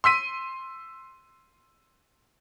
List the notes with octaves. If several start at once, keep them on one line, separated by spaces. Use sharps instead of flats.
C6 E6 B6 D#7